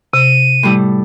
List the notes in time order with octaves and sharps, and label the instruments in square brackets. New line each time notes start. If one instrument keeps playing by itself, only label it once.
[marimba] C3 [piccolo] D#7
[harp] A2 G3 E4